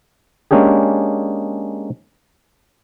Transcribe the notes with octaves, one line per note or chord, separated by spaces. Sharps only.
G#3 A#3 C#4 D4 G4 G#4